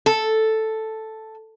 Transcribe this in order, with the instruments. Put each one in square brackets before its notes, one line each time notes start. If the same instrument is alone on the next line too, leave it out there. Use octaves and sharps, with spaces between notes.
[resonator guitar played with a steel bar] A4